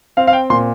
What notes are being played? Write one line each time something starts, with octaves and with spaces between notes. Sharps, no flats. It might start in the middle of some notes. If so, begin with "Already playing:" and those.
C4 F5
F5
G5
A#2 C6